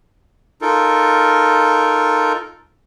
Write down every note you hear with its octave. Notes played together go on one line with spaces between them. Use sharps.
D#4 F4 A4 A#4